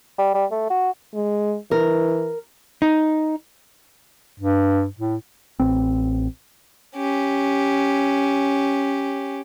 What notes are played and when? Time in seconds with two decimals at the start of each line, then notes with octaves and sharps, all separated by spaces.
0.19 G3
0.34 G3
0.51 A3
0.70 F#4
1.14 G#3
1.71 E3 A#4
2.82 D#4
4.40 G2
4.99 A2
5.60 A1 C4
6.96 C#4 G4